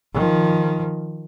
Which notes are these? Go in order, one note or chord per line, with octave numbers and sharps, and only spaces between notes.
D#3 F3